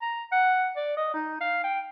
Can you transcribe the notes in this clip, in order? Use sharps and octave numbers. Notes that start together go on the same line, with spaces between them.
A#5
F#5
D5
D#5
D#4
F5
G5